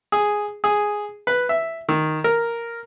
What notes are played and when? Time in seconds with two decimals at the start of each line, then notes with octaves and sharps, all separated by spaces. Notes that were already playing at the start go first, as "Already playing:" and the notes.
0.12 G#4
0.64 G#4
1.27 B4
1.49 E5
1.89 D#3
2.24 A#4